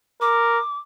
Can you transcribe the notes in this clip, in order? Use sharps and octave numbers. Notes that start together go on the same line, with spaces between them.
A#4 D6